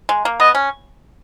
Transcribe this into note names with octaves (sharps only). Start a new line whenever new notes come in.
G#3
A#3
B3 D#5
C#4